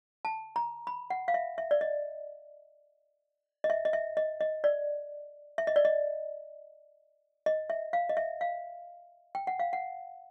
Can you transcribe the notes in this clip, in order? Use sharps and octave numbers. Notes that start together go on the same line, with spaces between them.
A5
A#5
B5
F#5
F5
E5
E5
D5
D#5
D#5
E5
D#5
E5
D#5
D#5
D5
E5
D#5
D5
D#5
D#5
E5
F5
D#5
E5
F5
G5
F#5
F5
F#5